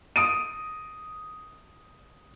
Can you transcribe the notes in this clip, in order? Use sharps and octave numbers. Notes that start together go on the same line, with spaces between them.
D#6 D7 D#7